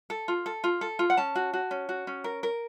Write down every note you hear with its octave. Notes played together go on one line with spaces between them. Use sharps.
A4
F4
A4
F4
A4
F4
F#5
C#4 A5
F#4
F#4
C#4
F#4
C#4
A#4
A#4